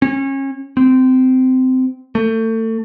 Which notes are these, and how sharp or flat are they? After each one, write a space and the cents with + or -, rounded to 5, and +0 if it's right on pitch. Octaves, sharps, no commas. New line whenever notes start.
C#4 -30
C4 -20
A3 +30